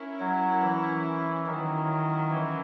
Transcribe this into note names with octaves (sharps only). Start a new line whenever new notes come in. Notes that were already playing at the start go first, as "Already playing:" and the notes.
Already playing: C#4 E4 A#4
F#3
E3
D#3 F#3 C#4 E4 A#4
E3